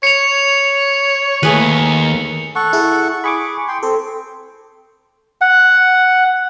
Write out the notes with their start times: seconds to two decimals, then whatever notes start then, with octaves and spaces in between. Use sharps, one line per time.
0.03 C#5 C#7 F7
1.43 D#2 A3 G#4 B4
2.56 A4 F#5 C#6
2.73 E4 G#4
3.24 G#4 B5 C#6 D6
3.68 G5 C6
3.83 C4 A4
5.41 F#5